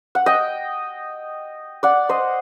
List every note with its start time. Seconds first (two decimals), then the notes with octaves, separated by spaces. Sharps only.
0.15 F#5
0.26 D#5 G5
1.83 D5 F#5
2.09 C5 D#5